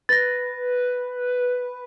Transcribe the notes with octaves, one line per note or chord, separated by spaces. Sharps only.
B4 A6 A#6